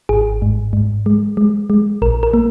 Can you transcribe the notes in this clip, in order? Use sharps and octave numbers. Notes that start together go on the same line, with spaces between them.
G#1 G#4
G#2
G#2
G#3
G#3
G#3
A#1 A#4
A#4
A#3